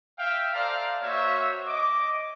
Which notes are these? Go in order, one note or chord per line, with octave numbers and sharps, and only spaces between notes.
E5 F5 G5
A4 C5 D5 F5 A5 A#5
A#3 F#4 C5 C#5 E5
D#5 D6